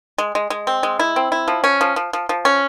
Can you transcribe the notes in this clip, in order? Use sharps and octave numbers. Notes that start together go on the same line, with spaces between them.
G#3
G#3
G#3
C4
G#3
E4
C4
E4
F3
C#4
F3
F3
F3
F3
C#4